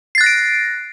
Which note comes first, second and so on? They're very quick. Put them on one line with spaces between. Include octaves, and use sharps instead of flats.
C7 A6 F#6 A#6 D7